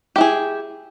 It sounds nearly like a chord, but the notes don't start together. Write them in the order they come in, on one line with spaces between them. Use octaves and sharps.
G4 E4 G#4